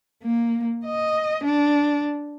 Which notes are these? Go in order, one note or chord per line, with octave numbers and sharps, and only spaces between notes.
A#3
D#5
D4